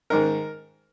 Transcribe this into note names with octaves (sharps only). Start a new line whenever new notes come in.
G#2 D#3 A#4